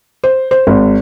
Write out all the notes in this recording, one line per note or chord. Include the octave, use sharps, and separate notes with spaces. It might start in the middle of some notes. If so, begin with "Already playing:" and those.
C5
C5
G#1